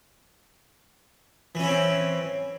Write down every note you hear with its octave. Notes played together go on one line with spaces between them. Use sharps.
E3 C4 C#4 E4